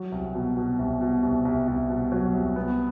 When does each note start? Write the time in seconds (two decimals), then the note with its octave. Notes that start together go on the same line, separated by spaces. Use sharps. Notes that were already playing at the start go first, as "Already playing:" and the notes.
Already playing: F#3
0.12 C2
0.34 B2
0.57 B2
0.79 C2
1.01 B2
1.23 C2
1.45 C2
1.68 C2
1.90 B2
2.12 F#3
2.34 C2
2.56 B3